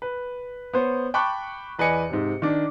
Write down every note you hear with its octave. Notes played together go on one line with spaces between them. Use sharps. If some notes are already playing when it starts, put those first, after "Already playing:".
B4
B3 C5 C#5
G5 A5 B5 C#6 D6 F#6
E2 B4 D5 D#5 G#5 C#7
G#2 C3
D#3 D4